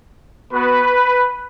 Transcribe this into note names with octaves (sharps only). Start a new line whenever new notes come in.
B3 F#4 B4